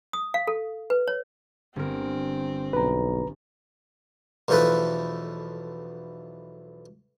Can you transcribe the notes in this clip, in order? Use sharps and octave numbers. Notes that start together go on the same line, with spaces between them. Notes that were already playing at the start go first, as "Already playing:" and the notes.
D#6
F5
A4
B4
C#5
G1 C4 A#4
B1 B4 A#5
B1 E2 F3 A3 A4 B4